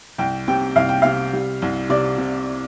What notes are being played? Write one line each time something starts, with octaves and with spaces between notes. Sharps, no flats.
C2 G5
C3 G5
C2 F5
G5
C3 F5
G3
C2
C3 D5
C3